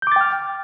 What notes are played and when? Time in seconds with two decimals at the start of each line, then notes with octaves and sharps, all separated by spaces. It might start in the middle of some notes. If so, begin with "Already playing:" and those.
0.02 G6
0.07 D6
0.12 A6
0.16 G5
0.21 F6